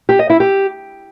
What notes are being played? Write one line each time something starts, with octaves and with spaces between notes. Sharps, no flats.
G4
D#5
E4
G4